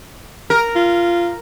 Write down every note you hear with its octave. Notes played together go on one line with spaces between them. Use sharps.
A#4
F4